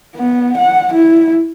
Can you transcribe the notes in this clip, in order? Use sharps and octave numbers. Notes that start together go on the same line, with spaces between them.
B3
F#5
E4